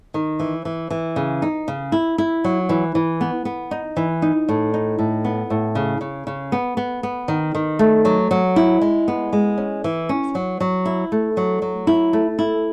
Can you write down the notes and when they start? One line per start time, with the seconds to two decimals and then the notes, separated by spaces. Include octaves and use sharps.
0.14 D#3
0.40 E3
0.65 E3
0.90 E3
1.16 C#3
1.42 D#4
1.68 C#3
1.92 E4
2.18 E4
2.44 F#3
2.69 E3
2.95 E3
3.21 B3
3.45 B3
3.71 D#4
3.97 E3
4.22 D#4
4.49 A2
4.74 D#4
4.99 A2
5.25 B3
5.50 A2
5.75 C#3
6.01 C#3
6.27 C#3
6.52 B3
6.77 B3
7.03 B3
7.28 D#3
7.55 D#3
7.79 A3
8.05 F#3
8.31 F#3
8.56 E4
8.81 G#3
9.08 B3
9.33 G#3
9.58 C#4
9.84 E3
10.09 C#4
10.35 F#3
10.60 F#3
10.85 E4
11.12 A3
11.37 F#3
11.62 F#3
11.87 E4
12.13 A3
12.39 E4